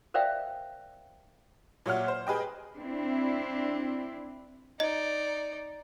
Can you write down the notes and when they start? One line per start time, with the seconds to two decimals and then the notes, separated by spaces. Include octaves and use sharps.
0.14 A#4 C5 D5 E5 F5 G5
1.86 A#2 F#3 C#5 E5 F#5 F6
2.08 C5
2.27 G#4 B4 D#5 G5
2.76 C4 D4 E4
4.80 D#4 D5 D#5